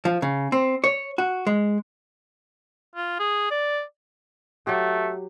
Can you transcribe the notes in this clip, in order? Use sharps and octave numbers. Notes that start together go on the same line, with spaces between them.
F3
C#3
C4
C#5
F#4
G#3
F4
G#4
D5
F#3 A3 G4